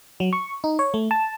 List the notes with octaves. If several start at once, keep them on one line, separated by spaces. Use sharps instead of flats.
F#3
C#6
D#4
C#5
A3
A5